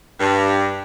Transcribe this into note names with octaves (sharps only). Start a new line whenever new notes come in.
G2